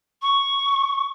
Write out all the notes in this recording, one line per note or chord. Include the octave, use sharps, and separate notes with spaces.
C#6